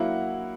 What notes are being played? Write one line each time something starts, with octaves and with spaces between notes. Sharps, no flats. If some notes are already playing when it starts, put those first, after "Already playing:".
Already playing: F#3 A#3 E4 F#5